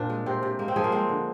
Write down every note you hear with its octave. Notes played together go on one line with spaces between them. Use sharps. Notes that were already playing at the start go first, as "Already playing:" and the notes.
Already playing: A#2 C4 D4
G#3
C3 C4
C3
G#3 A#3
C4
F3 G#4
A#3
G#3 C4
D3